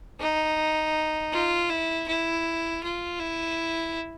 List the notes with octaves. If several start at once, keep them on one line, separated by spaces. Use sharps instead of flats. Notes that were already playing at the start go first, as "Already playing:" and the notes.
D#4
F4
E4
E4
F4
E4